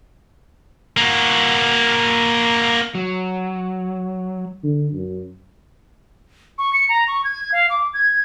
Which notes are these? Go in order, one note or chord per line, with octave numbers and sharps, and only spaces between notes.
A#3 F#4
F#3
D3
F#2
C#6
C#7
A#5
C#6
G#6
F5
D6
G#6